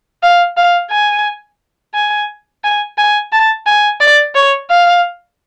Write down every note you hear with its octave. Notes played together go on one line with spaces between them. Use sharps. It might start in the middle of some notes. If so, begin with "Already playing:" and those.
F5
F5
G#5
G#5
G#5
G#5
A5
G#5
D5
C#5
F5